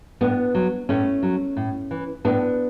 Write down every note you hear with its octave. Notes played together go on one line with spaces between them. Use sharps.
A2 B3 D4
F#3
A2 A3 C#4
F#3
A2
E3
A2 B3 D4